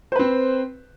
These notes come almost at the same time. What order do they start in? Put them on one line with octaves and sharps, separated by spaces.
C5 B4 C4